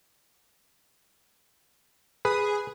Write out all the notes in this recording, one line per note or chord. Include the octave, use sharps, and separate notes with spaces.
G#4 B4